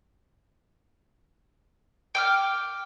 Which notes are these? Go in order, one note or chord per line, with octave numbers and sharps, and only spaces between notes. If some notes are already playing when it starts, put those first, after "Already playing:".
G5 D6 F6